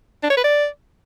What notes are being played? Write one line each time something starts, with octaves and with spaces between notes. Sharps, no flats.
D4
C#5
B4
D5